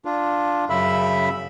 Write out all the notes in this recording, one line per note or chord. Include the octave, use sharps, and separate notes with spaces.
D4 F4
F#2 C#3 E5 B5